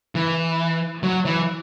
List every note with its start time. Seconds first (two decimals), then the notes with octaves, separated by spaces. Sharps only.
0.15 E3
1.03 F#3
1.25 E3